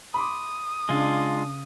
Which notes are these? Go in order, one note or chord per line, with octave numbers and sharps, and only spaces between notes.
B5 C6 D6 D#6
C#3 G#3 D4 F4